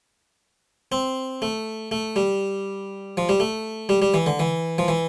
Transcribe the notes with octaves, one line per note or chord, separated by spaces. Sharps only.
C4
A3
A3
G3
F3
G3
A3
G3
G3
E3
D3
E3
F3
E3